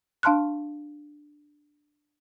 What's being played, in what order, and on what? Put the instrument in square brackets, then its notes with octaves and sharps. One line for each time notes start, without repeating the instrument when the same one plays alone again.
[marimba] D4 F5 A5 C6 F6 F#6